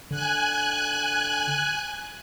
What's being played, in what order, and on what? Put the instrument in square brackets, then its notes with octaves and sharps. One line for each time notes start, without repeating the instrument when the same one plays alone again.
[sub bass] D3 [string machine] G#5 F#6